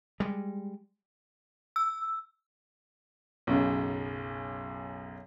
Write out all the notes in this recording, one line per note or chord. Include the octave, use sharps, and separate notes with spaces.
G3 G#3
E6
B1 F#2 C#3